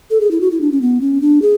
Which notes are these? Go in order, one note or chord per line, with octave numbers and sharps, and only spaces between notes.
A4
G#4
E4
F#4
E4
D4
C#4
B3
C#4
D4
G#4